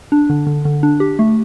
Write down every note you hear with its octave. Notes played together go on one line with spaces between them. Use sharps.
D4
D3
D3
D3
D4
G4
A3